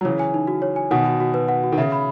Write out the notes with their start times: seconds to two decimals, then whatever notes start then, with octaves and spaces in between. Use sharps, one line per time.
0.01 F#3
0.04 C#3 E3 C#5
0.19 G#5
0.34 D#4
0.47 F#4
0.62 C#5
0.76 G#5
0.91 B2 D#3 F#5
1.05 F#4
1.20 F#4
1.34 B4
1.48 F#5
1.63 F#4
1.72 D#3
1.78 C#3 E5
1.92 B5